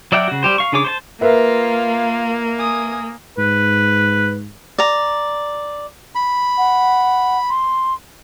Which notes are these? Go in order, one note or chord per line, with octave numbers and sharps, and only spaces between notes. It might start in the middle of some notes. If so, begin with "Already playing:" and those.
F#3 D5 E5 F#5 G5
C#3 F#4
G3 G4 C5
F5 C#6
C#3 D4 G#4 C#5 D6
C5 C#5 A5
A#3 F4 A#4 B4 E5 F5
G#5 D#6
G#2 B4
D5 A#5
B5
F#5
C6